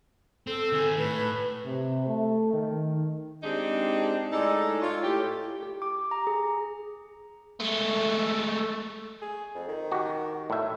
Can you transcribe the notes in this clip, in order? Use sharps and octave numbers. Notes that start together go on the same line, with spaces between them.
C4 A4
D#3 G#4
A2 B4
C3
A3
D#3
G#3 C4 D4 D#4 G4 G#4
A2 G#3 D#4 A4 D5
F4 C#5
A2 G4
G4
D6
A#5
G#4
G#3 A3
G#4
F2
D#3
F#4 G4
A2 E5